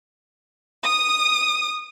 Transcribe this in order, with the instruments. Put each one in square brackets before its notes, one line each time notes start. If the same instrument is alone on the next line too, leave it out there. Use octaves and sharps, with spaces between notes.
[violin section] D#6